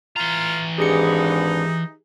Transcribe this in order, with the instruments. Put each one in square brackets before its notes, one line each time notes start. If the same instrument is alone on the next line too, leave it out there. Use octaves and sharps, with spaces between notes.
[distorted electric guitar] E3 A#5 [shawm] F4
[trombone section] G#1 D4 B4 [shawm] D#4 [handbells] G4 G#4 C#7